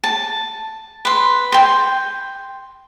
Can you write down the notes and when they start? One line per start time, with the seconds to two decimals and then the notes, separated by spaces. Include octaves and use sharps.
0.04 A5
1.05 B4 C6
1.52 G5 C6